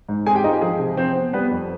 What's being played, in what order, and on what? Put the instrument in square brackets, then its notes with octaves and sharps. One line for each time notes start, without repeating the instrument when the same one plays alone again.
[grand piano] G#2
C4 G#4 G#5
G4 G5
D#4 F4 D#5
G4
F3 G#4
C3
F3 C4 C5
B3
G3 B3 B4
F2